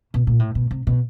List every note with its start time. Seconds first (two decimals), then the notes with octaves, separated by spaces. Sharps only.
0.14 B2
0.27 A#2
0.39 A2
0.55 B2
0.71 C3
0.87 B2